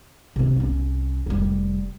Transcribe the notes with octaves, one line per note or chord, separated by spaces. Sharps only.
C3 C4
C2 C#4
F1 G3